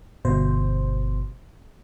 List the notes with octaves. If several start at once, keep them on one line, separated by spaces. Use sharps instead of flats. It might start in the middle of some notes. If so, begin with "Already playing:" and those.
G1 B2 C5